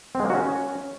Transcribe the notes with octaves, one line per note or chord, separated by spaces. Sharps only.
C4
G#3
A#3
F#4
C#4